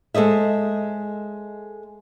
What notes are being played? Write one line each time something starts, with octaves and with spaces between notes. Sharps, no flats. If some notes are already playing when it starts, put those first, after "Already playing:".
G#3 A4 C5 D#5 E5